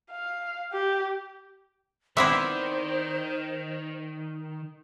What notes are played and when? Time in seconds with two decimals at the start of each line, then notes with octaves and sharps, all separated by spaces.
0.11 F5
0.73 G4
2.17 D#3 B3 C4 E4 C5 D5 E5 C6